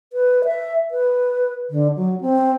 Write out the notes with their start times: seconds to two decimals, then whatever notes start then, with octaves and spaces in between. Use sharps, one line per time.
0.13 B4
0.45 E5
0.91 B4
1.70 D3
1.96 F#3
2.21 C4